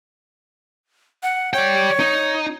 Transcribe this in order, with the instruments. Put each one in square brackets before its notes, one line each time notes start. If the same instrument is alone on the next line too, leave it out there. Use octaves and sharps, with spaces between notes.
[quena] F#5
[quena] C#5 [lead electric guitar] D5 G5
[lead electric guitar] D#4